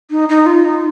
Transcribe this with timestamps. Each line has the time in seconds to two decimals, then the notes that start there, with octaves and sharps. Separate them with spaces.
0.11 D#4
0.29 D#4
0.46 F4
0.65 D#4